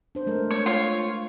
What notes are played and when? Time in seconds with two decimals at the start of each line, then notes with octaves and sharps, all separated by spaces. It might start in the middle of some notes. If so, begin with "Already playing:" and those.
0.15 D4 C5
0.27 G#3 A3 A#4
0.51 C#5
0.66 F4 C#5